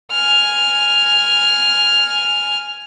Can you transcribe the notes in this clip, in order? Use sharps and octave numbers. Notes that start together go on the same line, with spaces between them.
G#5 F6